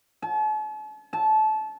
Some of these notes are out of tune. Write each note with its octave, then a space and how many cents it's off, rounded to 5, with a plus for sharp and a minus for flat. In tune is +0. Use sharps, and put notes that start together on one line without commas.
A5 -45
A5 -25